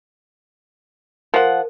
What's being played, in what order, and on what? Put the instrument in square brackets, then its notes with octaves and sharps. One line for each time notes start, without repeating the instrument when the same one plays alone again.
[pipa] F3 F#5 [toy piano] A#4